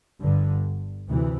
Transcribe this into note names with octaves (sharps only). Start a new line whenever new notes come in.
G1 G2 D3
D2 C3 E3